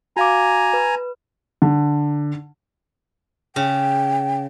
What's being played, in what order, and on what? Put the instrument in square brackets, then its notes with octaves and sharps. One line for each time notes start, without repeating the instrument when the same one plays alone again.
[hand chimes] F#4 F5 D6 [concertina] G#5 A#5
[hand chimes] B4
[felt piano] D3
[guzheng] C#3 [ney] G5